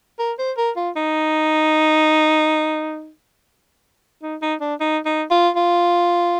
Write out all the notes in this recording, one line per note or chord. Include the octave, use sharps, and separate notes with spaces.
A#4
C5
A#4
F4
D#4
D#4
D#4
D4
D#4
D#4
F4
F4